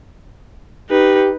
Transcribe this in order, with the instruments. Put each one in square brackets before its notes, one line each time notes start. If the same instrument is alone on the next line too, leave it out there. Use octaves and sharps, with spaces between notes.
[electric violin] D#4 B4 [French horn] G4